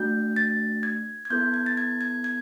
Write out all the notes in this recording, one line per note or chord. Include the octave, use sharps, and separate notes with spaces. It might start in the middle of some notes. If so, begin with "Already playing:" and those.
Already playing: A3 D4 F#4 G6
A6
G#6
G#6
B3 E4 A4 G6
G#6
A6
G#6
G#6
G#6